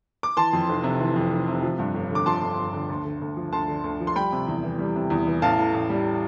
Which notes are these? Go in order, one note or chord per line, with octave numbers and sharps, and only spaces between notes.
D6
E3 A5 C6
F2
F1
C3
E3
F2
F1
C3
F3
G2
G1
D3
D6
F3 A5 C6
G2
G1
D3
D2
D3
D2
F3
D2 A5 C6
D3
D2
F3
C6
G3 G5 B5
C3
E2
E3
G3
C3
E2
E3
A1 F5 A5
A2
A1
G3